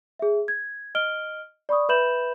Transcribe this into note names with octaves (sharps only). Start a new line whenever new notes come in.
G#4 E5
G#6
D#5 F6 D7 G7
D5 B5 C#6 D#6
B4 E5 B5 G6 E7 F#7